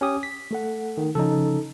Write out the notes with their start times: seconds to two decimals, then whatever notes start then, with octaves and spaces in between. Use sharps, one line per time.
0.01 C#4 G4 D#6
0.23 B6
0.51 A3 A4 F#5
0.97 D#3
1.15 C#3 F3 C#4 D#4 A4